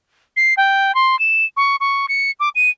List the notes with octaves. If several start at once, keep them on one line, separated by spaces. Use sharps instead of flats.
C7
G5
C6
E7
C#6
C#6
C#7
D6
D#7